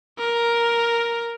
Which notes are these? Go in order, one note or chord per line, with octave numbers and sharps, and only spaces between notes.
A#4